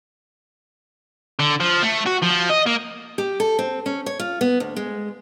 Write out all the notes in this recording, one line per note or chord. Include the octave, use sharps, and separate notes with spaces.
D3
F3
A3
F#4
F3
D#5
A#3
G4
A4
C4
C#4
C#5
F4
B3
D2
G#3